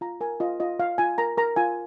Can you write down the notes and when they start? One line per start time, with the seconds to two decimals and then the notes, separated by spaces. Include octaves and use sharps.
0.01 F4 A#5
0.21 A#4 G#5
0.40 F4 D#5
0.60 F4 D#5
0.79 F4 F5
0.98 F4 G#5
1.18 A#4 A#5
1.38 A#4 A#5
1.56 F4 G#5